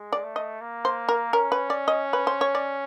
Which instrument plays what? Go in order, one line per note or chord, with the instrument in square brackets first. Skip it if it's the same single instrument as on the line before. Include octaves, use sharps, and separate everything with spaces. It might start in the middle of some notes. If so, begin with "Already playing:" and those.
Already playing: [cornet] G#3
[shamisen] D5
[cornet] A3
[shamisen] D#5
[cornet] A#3
[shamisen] C5
A#4
[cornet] C#4 [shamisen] A#4
[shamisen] B4
D5
D#5
B4
C5
C#5
D5